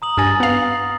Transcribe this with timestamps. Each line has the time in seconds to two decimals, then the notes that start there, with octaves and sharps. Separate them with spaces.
0.02 A#5 D#6 F#7
0.17 G2 G#5 F6 A6 A#6
0.40 B3 F5